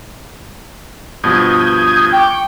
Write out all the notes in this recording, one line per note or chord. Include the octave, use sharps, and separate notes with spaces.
G2 B2 F3 D#6 G6 G#6
G5 C#6 D6